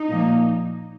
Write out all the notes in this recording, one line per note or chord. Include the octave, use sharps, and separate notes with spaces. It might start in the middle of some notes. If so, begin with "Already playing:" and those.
Already playing: D#4
A#2 F3 A#3